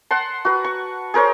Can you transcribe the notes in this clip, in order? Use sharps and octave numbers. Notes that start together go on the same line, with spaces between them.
F#5 A5 C6
F#4 B4
C#6
G#4 A#4 C5 C#5